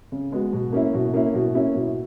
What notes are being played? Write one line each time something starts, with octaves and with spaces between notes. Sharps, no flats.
C#3
G#3 B3 F#4
B2
A#3 C#4 E4
B2
A#3 C#4 E4
B2
A#3 C#4 E4
B2